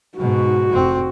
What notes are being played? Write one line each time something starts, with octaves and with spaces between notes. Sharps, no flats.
G#2 B2 F#4
F1 C4